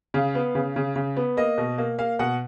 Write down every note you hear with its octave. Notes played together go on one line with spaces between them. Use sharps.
C#3 F5
B3
C#3
C#3
C#3
B3
A#3 D#5
B2
A#3
A#3 F5
B2 F#5